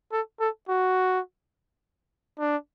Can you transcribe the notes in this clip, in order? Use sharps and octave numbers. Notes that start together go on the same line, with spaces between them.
A4
A4
F#4
D4